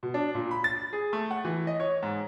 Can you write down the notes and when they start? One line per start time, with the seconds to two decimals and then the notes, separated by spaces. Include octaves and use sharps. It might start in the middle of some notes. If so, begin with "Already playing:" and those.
0.03 B2
0.14 D4
0.35 A#2
0.51 B5
0.64 A6
0.93 G#4
1.13 A3
1.31 F#5
1.45 E3
1.67 D#5
1.80 C#5
2.03 G#2